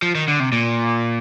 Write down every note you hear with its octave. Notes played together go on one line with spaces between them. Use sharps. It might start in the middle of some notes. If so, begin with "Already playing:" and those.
F3
D#3
D3
C3
A#2